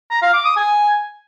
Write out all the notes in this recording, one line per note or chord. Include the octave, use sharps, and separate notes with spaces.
A#5
F5
D6
D#6
G#5